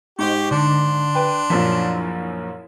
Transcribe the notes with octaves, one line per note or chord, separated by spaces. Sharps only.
G#2 G4 C5 D#5 C#6
D3 D4 C6
B4 G5
A#1 F#2 F3 E4